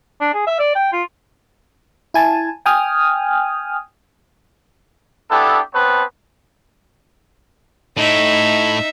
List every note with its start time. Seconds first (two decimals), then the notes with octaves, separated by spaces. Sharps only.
0.21 D4
0.34 G#4
0.47 E5
0.60 D5
0.75 G5
0.93 F4
2.14 E4 G#5 A5
2.66 G5 G#5 D#6 F6
5.30 B3 D4 E4 G4 A4
5.73 B3 C4 B4 C#5 A5
7.97 A2 D#4 E5